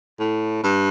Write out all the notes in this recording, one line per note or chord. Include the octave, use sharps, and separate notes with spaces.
A2
G2